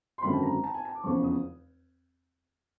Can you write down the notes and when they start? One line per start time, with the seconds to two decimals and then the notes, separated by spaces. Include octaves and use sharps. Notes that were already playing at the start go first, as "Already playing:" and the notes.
0.18 C6
0.22 G#1 F#2 D3 F#3 B5
0.33 A5
0.43 A#5
0.64 A5
0.74 G#5
0.85 A5
0.95 D6
1.04 F1 E2 C#3 F3 C#6
1.24 D#6